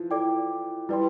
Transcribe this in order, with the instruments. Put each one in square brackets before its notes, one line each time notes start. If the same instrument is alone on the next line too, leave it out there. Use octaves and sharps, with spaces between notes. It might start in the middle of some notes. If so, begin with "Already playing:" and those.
Already playing: [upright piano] E3 F3
[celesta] E4 A4 D5 G5 D6
[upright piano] G3 [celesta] E4 B4 D5 G5 C6